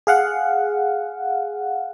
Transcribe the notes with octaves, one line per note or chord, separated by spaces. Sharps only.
G#4 F5 F#5